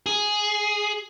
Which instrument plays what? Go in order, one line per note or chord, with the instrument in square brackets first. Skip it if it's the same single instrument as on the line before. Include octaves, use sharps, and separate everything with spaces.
[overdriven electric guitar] G#4